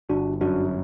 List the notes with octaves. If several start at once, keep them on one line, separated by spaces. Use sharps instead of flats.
G1 D4 F#4
F#2 D4 F#4